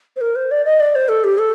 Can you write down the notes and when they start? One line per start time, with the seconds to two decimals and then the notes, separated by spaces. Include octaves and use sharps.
0.16 C5
0.21 A#4
0.36 C5
0.51 D5
0.65 D#5
0.80 D5
0.95 C5
1.09 A4
1.24 G4
1.38 A4